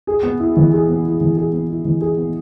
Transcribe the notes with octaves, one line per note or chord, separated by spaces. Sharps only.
G#4
B3
E4
E3
G#4
B3
E4
E3
G#4
B3
E4
E3
G#4
B3